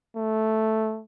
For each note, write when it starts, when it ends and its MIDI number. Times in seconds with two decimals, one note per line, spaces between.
0.16 1.02 57